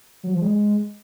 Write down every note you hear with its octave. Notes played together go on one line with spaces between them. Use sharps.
F#3
F3
G#3